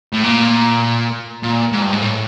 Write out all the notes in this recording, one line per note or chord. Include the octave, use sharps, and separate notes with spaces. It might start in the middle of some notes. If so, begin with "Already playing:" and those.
A2
A#2
A#2
G#2
G2
G#2
A2